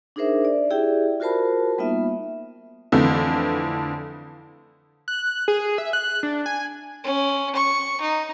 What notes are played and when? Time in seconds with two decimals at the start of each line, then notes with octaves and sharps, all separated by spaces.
0.16 D4 D#4 G#4 A#4 C5 E5
0.45 D5
0.70 E4 G4 G#4 D5 E5 G5
1.20 F4 F#4 A#4 C5 A5 B5
1.78 G3 A#3 B3 D#4 F4 E5
2.92 F2 D3 E3 A3
5.08 F#6
5.48 G#4
5.78 E5
5.93 F#6
6.23 D4
6.46 G#5
7.04 C#4
7.55 C#6
8.01 D#4